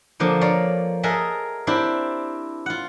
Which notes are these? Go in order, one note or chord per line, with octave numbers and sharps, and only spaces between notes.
D3 F3 A#3 D4
C#5 D5 F5 A#5
G#4 A#4 D#5 E5 F#5 A5
C4 D4 E4 G4 D5
F4 F#5